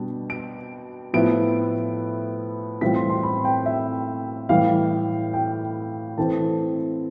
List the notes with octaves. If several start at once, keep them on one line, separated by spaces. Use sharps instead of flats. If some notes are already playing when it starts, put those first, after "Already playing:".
Already playing: B2 G3 D4
D7
A2 F3 B3 E4 D7
A2 E3 G3 C4 F4 B6
C6
C6
B5
G5
E5
A2 E3 G3 F5
G5
E3 A3 C4 A5